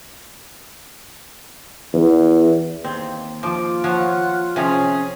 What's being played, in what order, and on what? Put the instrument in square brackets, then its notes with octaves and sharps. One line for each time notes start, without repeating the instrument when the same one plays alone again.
[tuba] E2
[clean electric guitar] D#2 [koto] C4
[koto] F3 [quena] F4 [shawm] D6
[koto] F3 C#5 [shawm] F#5
[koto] C3 F3 C#5 [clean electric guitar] C#4 [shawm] G#4